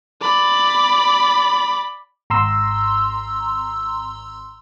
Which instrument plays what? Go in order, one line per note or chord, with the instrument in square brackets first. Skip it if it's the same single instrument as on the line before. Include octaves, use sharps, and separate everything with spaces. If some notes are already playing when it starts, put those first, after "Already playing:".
[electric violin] D5 B5
[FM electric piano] G#1 A#5 C6 E6